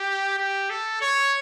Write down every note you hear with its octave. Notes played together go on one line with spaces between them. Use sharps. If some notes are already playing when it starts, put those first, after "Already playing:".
Already playing: G4
G4
A4
C#5